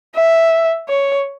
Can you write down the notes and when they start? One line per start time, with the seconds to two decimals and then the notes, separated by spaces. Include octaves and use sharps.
0.14 E5
0.88 C#5